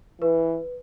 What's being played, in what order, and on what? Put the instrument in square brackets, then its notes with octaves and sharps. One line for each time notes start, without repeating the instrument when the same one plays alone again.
[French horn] E3 [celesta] B4